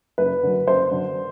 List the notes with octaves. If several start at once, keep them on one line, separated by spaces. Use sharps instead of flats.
F#1 B4
F#2 D3
F#1 C5
F#2 D3